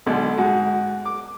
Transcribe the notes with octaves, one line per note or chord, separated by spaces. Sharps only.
B1 B2 D3 G#3
G#2 F#4
D6